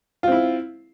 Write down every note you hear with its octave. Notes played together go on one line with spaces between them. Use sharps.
C4 E4 F4